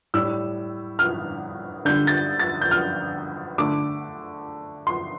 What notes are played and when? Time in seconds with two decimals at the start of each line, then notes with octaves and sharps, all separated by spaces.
0.14 A2 G3 E6
0.99 F6
1.85 D3 G6
1.89 G3
2.07 A6
2.39 A6
2.61 G6
2.71 F6
3.58 D3 A3 D6
4.87 C6